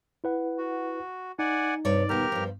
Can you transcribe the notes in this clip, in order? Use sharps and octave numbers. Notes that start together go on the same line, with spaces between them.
E4 B4 F#5
F#4
D#4 D5 F#5 G#5
G2 C3 C#5 D5
D#2 B2 G4 A#4 F6
G2 F3